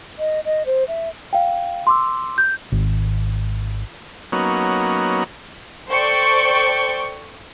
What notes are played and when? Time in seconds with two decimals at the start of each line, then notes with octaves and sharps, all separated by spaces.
0.18 D#5
0.45 D#5
0.66 C5
0.88 E5
1.33 F5 G5
1.87 C6 D6 E6
2.38 G6
2.72 G#1
4.32 F#3 A#3 B3 C#4 D#4
5.90 A4 C5 D5 G5 C#6